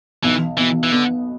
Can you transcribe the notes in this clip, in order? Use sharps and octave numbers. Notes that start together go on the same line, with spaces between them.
B1 E3
B2 E3
E3
D3 B3